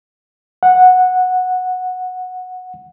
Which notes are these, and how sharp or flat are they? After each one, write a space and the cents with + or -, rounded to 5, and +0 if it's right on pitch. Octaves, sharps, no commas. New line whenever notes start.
F#5 -10